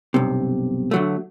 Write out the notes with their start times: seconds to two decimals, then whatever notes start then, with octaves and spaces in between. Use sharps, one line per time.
0.14 B1 G2 C3
0.91 D3 F#3 A3